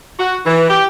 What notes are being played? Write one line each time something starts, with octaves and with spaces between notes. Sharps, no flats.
F#4
E3
G4